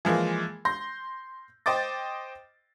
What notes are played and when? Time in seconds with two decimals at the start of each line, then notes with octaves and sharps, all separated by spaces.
0.05 E3 F3 G#3 A#3
0.65 C6 G6 A#6
1.66 C5 D#5 G5 D6 A6